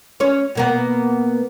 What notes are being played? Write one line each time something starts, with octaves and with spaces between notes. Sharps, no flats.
C#4 C#5
B2 A#3 B3